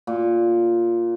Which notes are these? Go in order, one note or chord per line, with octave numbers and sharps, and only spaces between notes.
A#2